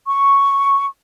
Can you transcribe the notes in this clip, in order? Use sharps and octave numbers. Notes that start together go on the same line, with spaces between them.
C#6